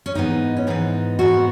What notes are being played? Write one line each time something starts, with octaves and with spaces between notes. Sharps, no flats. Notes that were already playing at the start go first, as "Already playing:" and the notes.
C#4
G#2 E3 B3 D#4
C#4
G#2 E3 B3 D#4
G#2 E3 B3 F#4